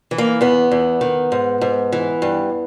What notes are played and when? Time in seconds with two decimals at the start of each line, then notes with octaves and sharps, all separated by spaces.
0.11 E3
0.18 A#3
0.41 E2 B3
0.71 E2
1.01 D#3
1.32 G#2
1.61 G#2
1.92 E3
2.22 G2